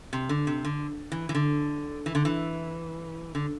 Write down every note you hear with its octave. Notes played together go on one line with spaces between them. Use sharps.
C3
D3
C3
D3
E3
E3
D3
E3
D3
E3
D3